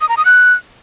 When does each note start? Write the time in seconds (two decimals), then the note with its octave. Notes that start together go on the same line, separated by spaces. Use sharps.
0.01 D#6
0.09 A#5
0.17 D#6
0.25 F#6